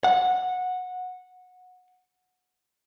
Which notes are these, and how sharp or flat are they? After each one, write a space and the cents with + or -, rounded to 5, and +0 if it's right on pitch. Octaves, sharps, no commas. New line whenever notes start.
F#5 -15